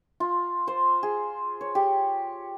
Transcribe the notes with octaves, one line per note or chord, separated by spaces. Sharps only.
F4
C5
G#4
C#5
G4